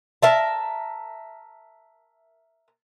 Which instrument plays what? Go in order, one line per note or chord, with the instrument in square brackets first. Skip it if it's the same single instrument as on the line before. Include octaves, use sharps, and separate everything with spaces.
[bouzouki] A#4 E5 A5